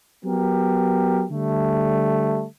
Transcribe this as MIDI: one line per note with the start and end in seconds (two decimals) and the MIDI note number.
0.24 1.25 54
0.24 1.25 59
0.24 1.25 67
0.24 1.25 70
1.31 2.46 50
1.31 2.46 55
1.31 2.46 57